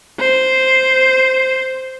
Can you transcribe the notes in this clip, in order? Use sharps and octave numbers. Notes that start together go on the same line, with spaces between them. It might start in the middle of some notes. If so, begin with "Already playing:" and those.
C5